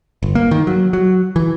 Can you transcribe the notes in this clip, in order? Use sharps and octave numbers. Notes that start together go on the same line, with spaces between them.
G1
A#3
D#3
F#3
F#3
E3